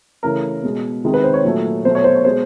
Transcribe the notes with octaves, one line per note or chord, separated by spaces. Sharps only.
C#3 E3 A3 A#4
B2 G#3
C3 D#3 G#3
B4
C5
C#5
A#2 F#3 A3
B2 F#3 A3 C5
C#5
C5
C#5
B2 G#3 C5